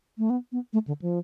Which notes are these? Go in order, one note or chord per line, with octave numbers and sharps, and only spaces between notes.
A3
B3
B3
A3
D3
F3